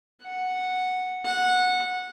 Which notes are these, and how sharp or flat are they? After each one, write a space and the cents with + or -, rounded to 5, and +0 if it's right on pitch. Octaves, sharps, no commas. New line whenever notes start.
F#5 -5
F#5 -15